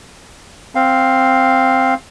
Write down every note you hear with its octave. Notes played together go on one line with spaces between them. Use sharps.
C4 F5